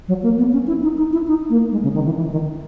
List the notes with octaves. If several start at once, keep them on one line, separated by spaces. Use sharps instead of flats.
F#3
A#3
B3
C#4
E4
D#4
D#4
E4
D#4
A#3
G#3
C#3
D#3
E3
E3
D#3